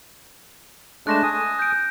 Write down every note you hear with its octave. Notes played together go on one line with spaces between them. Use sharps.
G#3 A3 D4 F#6 A#6 E7
G#5 D#6
G6 D7